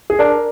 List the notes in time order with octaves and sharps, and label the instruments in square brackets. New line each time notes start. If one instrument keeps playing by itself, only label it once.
[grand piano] G#4
[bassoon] D4 [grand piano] A#4